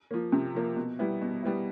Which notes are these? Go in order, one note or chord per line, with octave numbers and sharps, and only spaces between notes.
F3 A#3
C3
F3 A#3
B2
G3 B3 E4
B2
G3 B3 E4